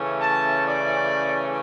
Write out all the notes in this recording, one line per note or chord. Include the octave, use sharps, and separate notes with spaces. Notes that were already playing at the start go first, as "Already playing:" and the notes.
Already playing: C#3 E3 A3 C#4
A5
D5